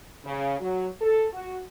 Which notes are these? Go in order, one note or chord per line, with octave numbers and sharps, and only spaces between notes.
C#3
F#3
A4
F#4